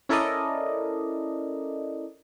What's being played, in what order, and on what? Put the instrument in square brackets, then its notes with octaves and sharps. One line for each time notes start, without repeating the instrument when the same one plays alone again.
[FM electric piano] C#4 E4 A4 A#4 D5 D#5